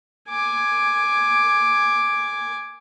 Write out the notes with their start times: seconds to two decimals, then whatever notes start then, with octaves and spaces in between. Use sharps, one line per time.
0.29 G#5 D6